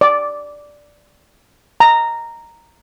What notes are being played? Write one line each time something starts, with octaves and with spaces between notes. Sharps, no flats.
D5
A#5